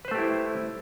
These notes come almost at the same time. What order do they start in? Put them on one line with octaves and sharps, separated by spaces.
B4 C5 A3 G4 E4